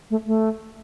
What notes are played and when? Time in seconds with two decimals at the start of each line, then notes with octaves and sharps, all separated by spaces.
0.10 A3
0.26 A3